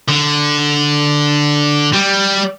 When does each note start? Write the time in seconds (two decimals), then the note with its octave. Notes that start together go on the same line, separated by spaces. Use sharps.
0.08 D3
1.94 G3